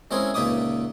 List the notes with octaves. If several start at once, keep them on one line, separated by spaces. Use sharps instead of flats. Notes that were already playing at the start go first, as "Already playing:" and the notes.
G#3 C4 C#4 E4 G#4 A#4
C#2 A#2 D#4 E5 D6 D#6